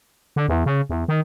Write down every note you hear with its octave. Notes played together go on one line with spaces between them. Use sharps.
D3
E2
C#3
E2
D#3